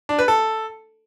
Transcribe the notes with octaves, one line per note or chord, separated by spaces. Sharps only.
D4
B4
A4